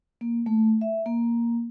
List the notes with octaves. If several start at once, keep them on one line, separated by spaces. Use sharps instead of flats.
A#3
A3
E5
A#3